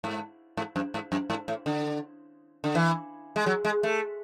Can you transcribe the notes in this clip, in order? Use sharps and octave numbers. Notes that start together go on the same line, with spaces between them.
G#2
G#2
F#2
G#2
F#2
G#2
A2
D3
D3
E3
G#3
F#3
G#3
A3